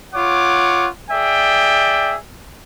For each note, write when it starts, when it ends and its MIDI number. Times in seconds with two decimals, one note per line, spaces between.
0.14 0.87 65
0.14 0.87 73
0.14 0.87 78
0.14 0.87 86
1.11 2.15 68
1.11 2.15 74
1.11 2.15 76
1.11 2.15 79